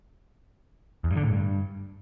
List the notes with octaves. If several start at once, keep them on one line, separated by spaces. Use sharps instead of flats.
E2
G2
D3
A2
G2